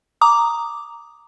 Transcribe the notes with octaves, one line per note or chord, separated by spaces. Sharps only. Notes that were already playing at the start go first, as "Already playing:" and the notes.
A#5 D6 D#6